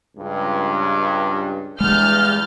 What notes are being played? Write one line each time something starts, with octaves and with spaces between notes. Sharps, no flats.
C#2 G2
E2 G2 G#3 F6 G6 A6